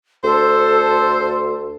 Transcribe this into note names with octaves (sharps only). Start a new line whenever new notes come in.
D2 A4 C5